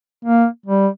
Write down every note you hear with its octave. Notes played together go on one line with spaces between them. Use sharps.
A#3
G3